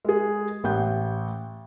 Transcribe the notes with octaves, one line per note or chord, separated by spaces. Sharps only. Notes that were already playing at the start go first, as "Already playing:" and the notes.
G#3 G#4
A1 F#5 G6